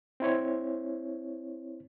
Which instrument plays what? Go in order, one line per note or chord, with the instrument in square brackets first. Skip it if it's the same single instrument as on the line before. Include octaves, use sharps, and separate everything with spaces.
[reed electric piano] C4 E4 C#5